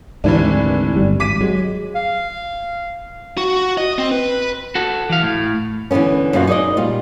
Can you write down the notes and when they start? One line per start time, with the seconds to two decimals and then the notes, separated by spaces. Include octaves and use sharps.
0.24 F1 D2 G#2 D#3 E3 D4
0.96 G1 G3
1.20 G#1 D6 B6 D#7
1.41 F#3 G#3
1.96 F5
3.38 F#4
3.78 D#5
3.98 C4
4.11 B4
4.75 F#4 A4
5.10 E3 F5
5.23 A2
5.91 D3 E3 G#3 B3 C#4
6.33 F#2 B2 A#3 F4 F#4
6.47 D#4 G#4 C5 D5 D#5
6.77 A#2 G3 F4